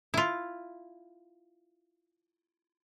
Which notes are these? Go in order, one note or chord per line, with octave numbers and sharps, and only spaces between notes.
E4 F4